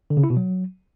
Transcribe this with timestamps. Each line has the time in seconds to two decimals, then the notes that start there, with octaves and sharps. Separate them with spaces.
0.10 D3
0.17 C#3
0.24 E4
0.30 B2
0.37 F#3